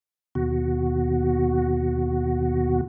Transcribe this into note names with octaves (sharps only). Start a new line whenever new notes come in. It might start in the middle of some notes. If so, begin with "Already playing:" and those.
D#2 B2 F#4